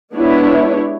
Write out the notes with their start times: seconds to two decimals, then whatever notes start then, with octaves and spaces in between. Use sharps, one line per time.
0.14 G#3 B3 D4 E4 G4 C#5